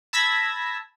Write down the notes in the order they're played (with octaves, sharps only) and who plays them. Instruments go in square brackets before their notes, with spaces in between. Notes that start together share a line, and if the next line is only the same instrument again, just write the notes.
[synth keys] A5 B5 E6 G#6 A#6 B6